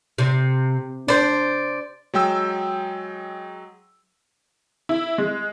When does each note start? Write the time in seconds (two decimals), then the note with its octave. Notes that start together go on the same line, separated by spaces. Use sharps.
0.18 C3
1.08 D4 C5 D5
2.14 F#3 G#3 G5 E6
4.89 E4
5.18 G#3